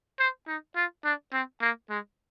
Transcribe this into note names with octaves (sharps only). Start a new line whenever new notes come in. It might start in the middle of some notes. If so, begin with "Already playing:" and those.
C5
D#4
F4
D4
C4
A#3
G#3